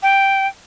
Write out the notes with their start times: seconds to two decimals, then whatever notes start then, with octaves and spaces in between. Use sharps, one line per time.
0.03 G5